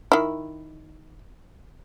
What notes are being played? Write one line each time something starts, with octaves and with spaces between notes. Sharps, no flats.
D#3 E4